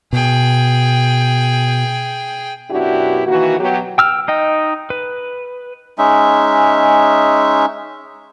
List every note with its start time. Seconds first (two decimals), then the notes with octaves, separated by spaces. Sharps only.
0.13 B2 G#4 G5
2.71 F#2 B2 D4 E4 F#4 G4
3.26 D#3 E3 A#3 F#4
3.60 B2 F#3 G4
3.98 G5 E6 F6
4.28 D#4 D#5 G5
4.90 B4
5.98 G#3 C#4 D#4 E5